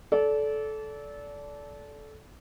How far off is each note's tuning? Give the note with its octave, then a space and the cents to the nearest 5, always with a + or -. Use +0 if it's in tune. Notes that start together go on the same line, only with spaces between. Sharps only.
A4 -20 D5 -25